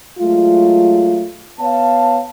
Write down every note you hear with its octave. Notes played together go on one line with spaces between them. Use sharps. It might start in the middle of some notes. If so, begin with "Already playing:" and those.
F#3 G#3 A3 F4
B3 C#5 F5 A5